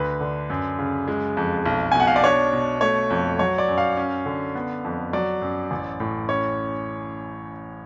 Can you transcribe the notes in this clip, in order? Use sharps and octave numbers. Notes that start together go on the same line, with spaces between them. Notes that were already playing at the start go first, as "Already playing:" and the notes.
Already playing: D2 B4
D3
F#2
C#3
G#3
F2
B1
G#5
B2 F#5
F5
D5
D4 C#5
B2
A3 C#5
F2
F#3 C#5
D5
F#2
F5
C#4
D3
B3
F2
F#3 D5
F#2
A1
A2
C#4 C#5